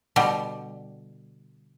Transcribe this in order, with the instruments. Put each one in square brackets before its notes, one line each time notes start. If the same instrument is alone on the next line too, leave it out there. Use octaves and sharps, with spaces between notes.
[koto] B2 D3 G3